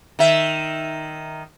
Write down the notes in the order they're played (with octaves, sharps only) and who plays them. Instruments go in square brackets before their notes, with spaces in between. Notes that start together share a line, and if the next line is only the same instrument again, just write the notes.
[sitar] D#3 E5